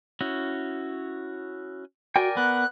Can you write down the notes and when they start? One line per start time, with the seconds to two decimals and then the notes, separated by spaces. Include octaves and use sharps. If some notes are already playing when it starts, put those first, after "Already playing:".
0.21 C#4 E4 F#4
2.16 F#4 A#4 D5 G5 G#5
2.37 B3 F#6